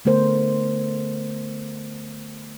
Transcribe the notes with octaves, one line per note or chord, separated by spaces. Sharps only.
D3 A3 B3 A#4 C5